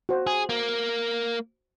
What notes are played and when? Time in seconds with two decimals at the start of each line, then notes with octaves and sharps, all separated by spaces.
0.09 F#4 C5
0.27 G#4
0.49 A#3